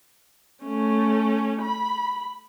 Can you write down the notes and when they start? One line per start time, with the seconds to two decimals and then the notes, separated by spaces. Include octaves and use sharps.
0.64 A3 C#4
1.62 B5